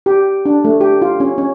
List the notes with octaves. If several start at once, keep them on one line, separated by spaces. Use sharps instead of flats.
G4
D4
A3
G4
F4
C#4
C#4